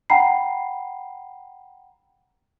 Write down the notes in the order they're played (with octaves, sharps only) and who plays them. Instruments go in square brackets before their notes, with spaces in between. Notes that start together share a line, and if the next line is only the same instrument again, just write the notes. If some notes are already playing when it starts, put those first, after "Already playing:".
[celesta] F#5 G5 A#5 B5 C7